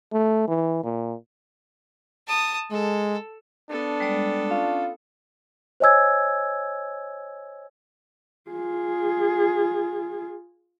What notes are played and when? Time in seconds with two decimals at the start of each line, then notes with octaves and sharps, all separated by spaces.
0.13 A3
0.48 E3
0.83 A#2
2.28 A5 D#6
2.71 G#3 A4
3.69 B3 D4 A4
4.00 G3 G#3 D5
4.51 C#4 F4
5.80 C5 C#5 D#5 G#5 E6 G#6
8.50 F4 G#4